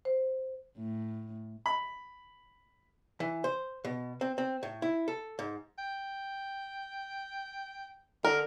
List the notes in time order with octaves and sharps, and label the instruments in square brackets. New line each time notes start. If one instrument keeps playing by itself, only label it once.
[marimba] C5
[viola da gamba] A2
[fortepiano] B5
[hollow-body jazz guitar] E3
C5
B2
C4
C4
A2
E4
A4
G#2
[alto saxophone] G5
[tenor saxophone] D3 [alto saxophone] A4 [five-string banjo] A#4